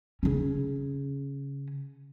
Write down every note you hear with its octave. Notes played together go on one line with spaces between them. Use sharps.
C#3 C#4